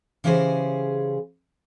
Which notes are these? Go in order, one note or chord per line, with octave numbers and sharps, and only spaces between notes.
C#3 E3 C#4 G4 G#4 C5